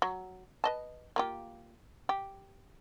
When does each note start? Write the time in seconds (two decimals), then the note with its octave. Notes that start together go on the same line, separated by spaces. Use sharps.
0.02 F#3
0.64 B4 D#5 A5
1.16 A#3 F4 G4
2.09 G4